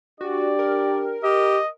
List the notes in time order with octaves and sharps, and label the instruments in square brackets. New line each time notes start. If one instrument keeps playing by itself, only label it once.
[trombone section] D4 G4 [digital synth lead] F#4 [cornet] D5
[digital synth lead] A#4
[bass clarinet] G4 [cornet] D#5